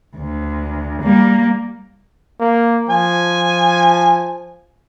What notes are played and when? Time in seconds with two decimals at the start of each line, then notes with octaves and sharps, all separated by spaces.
0.16 D2
1.02 G3 A#3
2.40 A#3
2.89 F3 G#5